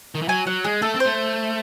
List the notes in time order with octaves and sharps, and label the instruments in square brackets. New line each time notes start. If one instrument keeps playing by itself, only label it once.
[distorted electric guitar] D#3
E3
[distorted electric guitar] F#3 [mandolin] G#5
[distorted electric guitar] F#3 [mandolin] F#5
[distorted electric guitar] G#3 [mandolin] G#4
[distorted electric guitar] A3 [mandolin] A4
[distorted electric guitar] C4
[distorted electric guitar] A3 [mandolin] C5